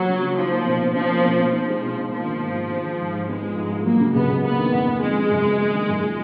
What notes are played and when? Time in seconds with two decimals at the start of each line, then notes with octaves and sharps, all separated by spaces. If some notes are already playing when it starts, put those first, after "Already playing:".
Already playing: F3 F#3 A#3 B3
0.09 C#3
0.22 C#4
0.37 F3 D#4
0.52 A#3
0.66 B2
0.81 B2
0.95 F3 C#4
1.10 A#3
1.25 B2
1.39 B2
1.53 F3 D#4
1.68 G#3
1.82 B2
1.97 B2
2.11 F3 A#3
2.26 D#3
2.41 G#2
2.55 F4
2.70 G#3
2.84 D#3
2.99 G#2
3.13 G#2
3.28 G#3 B3
3.42 F3
3.56 G#2
3.71 F4
3.85 F#3 A#3
4.00 C#3
4.14 C#2 B3
4.30 C#2
4.44 A#3 B3
4.59 D#3
4.73 F2
4.88 F2
5.02 F3 G#3
5.17 C#3
5.31 F#2
5.46 B3
5.60 A#3
5.74 D#3
5.89 F#2
6.03 F4